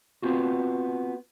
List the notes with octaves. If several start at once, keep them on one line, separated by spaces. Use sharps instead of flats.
B3 C4 F4 F#4